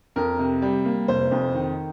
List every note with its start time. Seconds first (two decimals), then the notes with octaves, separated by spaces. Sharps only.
0.16 F2 A#4
0.39 C3
0.62 G3
0.85 A#3
1.08 F1 C5
1.31 F2
1.54 D#3